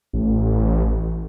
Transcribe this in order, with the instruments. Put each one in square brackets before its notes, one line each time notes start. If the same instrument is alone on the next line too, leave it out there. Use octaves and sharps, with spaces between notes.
[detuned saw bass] A1